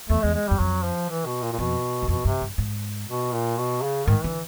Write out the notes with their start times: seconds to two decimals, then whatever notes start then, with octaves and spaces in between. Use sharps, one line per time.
0.09 E2 A3
0.22 E2 G#3
0.34 G#3
0.47 F#2 G3
0.59 F2 F#3
0.84 F3
1.09 E3
1.25 B2
1.42 A#2
1.53 A#2
1.58 F2 B2
2.02 E2
2.08 F2 B2
2.25 G2 C3
2.42 G2
2.58 G#2
3.08 B2
3.33 A#2
3.58 B2
3.83 C#3
4.07 G#2 D#3
4.24 D3 E3